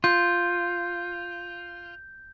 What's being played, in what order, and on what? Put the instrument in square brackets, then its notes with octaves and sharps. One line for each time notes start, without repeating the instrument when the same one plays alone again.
[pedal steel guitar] F4 [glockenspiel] G6